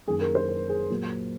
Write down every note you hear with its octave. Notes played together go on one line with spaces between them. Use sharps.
F#2 D#3 A#3 G#4
A#4
C5
A#4
G#4
A#2 F#3 A#3